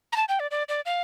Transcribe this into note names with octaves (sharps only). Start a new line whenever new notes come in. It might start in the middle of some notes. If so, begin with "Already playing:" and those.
A#5
A5
G5
D5
D5
D5
F5